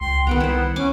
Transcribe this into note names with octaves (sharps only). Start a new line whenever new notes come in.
C#2 G5 C6
C2 D#3 B3 F#5 G5 A#5
E4 C5
C#4 G#5 D6